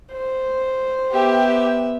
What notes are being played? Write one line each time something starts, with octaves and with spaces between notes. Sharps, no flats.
C5
B3 G4 E5